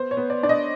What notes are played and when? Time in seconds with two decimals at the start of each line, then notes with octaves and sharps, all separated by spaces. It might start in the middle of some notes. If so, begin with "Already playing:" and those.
Already playing: B3 C5
0.11 C#5
0.17 B3
0.30 D5
0.43 D4 D5
0.49 D#5